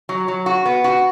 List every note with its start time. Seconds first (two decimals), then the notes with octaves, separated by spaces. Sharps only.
0.09 F#3
0.28 F#3
0.46 F#4
0.65 B3
0.84 F#4